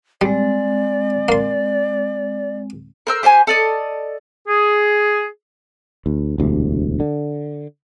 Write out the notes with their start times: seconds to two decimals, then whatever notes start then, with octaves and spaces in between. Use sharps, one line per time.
0.21 G3 G#3 C4 D5
1.29 A#3 C6
3.07 A#4 C5 E6
3.23 G4 C5 F5 G#5
3.47 A4 D5 D#5
4.47 G#4
6.06 D2
6.38 E1 D2 C3
7.00 D3